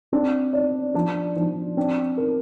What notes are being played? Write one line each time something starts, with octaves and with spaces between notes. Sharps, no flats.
C4 D4
D5
F3 D4
F3
C4 D4
A#4